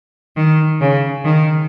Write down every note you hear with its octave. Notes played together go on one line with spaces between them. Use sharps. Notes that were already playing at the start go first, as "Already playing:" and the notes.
D#3
C#3
D#3